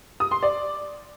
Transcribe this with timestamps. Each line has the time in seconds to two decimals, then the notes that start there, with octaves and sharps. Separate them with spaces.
0.20 D#6
0.31 C6
0.43 D5